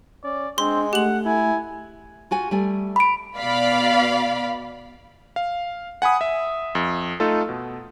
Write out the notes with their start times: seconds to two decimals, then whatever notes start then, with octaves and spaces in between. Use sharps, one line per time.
0.24 C#4 D5
0.58 G#3 C4 D4 C6
0.93 A3 G4 F#5 F#7
1.26 E4 G#5
2.31 F4 F#4 G#5
2.51 G3 A3 G#5
2.96 B5 D7
3.38 B2 D5 F5 B5
5.36 F5
6.02 F#5 G#5 B5 D#6
6.21 E5
6.75 F2
7.20 A3 D#4 F4 A4
7.49 B2